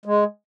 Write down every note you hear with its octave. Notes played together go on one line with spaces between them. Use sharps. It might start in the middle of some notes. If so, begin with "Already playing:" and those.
G#3